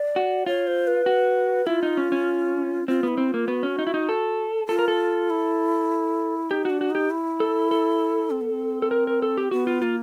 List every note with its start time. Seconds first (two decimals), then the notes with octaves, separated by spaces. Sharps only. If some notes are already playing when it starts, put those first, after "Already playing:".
Already playing: D5
0.16 F#4
0.46 F4 C#5
0.67 C5
0.87 B4
1.06 F#4
1.67 E4 F4
1.83 D#4
1.97 C#4
2.12 C#4
2.88 C4 F4
3.03 B3 E4
3.18 C4
3.29 F4
3.34 A#3
3.48 B3 F#4
3.63 C#4
3.79 D#4
3.87 E4
3.94 D#4
4.09 A4
4.69 F4 A4
4.79 A#4
4.88 A4
5.30 E4
6.50 D#4 G4
6.65 D4 F#4
6.81 F#4
6.90 D#4 G4
7.10 E4
7.40 A4
7.71 A4
8.31 C4
8.41 B3
8.50 C4
8.82 A4
8.91 A#4
9.07 A#4
9.22 A4
9.37 G4
9.51 B3 F#4
9.67 F4
9.82 A#3 F4